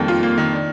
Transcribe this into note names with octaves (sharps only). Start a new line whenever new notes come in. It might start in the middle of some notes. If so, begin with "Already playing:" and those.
Already playing: F2 D#3 G3 A#3
F4
A#3
D#3
D4